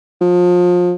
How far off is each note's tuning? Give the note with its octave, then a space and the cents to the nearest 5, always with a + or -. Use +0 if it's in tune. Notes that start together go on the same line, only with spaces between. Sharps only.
F3 +30